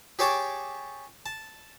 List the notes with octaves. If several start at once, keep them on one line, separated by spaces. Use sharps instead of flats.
G4 G#4 C#5 G5 A5 D6
A5